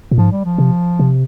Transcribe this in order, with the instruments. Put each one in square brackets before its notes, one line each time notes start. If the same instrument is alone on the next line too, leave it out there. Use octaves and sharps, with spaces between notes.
[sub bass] A#2
[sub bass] G#2 [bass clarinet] F3
[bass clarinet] G3
F3
[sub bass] C3
C3